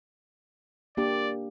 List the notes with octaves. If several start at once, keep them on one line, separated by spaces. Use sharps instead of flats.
A#3 D4 G4 D5